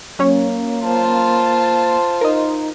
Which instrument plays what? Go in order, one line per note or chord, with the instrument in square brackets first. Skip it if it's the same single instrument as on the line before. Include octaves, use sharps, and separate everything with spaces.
[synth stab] F#3 C#4 C#5 [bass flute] A#3
[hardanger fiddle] F4 C5 [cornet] A5
[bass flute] D#4 [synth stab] A#4 D#5